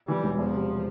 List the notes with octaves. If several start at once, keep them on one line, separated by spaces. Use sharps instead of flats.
E3 G3
E1
E2 F3
C3